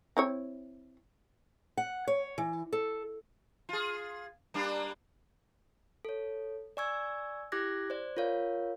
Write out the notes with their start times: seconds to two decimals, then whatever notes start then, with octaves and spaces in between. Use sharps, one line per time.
0.17 C4 E4 C#5
1.77 F#5
2.07 C#5
2.38 E3
2.73 A4
3.69 F4 G#4
4.54 G3 A#3 D4
6.05 A4 C#5
6.77 D5 G#5 C#6 E6 G#6
7.52 E4 G4 D6 F#6 G#6 A#6
7.90 C5 D5
8.17 F4 A#4 C#5 F5